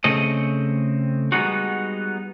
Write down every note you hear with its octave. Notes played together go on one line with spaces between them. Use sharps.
C#3 A3 C4 D#5
G3 G#3 B3 D#4 F#4